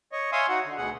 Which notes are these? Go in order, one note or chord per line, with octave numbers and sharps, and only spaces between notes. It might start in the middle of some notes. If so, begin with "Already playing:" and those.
C#5 D#5
C#5 E5 F5 G#5 C6 D#6
D#4 F#4 F#5
D3
D2 B2 G#4 F#5